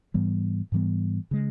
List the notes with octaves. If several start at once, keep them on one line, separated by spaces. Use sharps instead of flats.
G#2 E3 G3 B3
G#2 E3 G3 B3
C#3 G#3